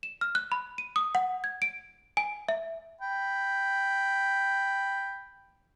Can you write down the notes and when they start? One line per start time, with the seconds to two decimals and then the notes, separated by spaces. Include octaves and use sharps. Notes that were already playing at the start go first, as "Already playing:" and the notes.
0.03 E7
0.21 F6
0.35 F#6
0.52 B5
0.78 D#7
0.96 D#6
1.15 F#5
1.44 G#6
1.62 D7
2.17 G#5
2.49 E5
3.01 G5 B5